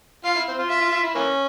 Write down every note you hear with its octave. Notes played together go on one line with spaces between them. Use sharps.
F4 F5
E4
C4
F4
F4 E5
F4
F4
E4
E3 A#3 C#4